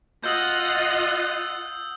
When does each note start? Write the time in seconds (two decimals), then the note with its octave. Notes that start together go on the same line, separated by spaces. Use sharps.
0.24 F4 D#5 F#5 D#6 E6 G6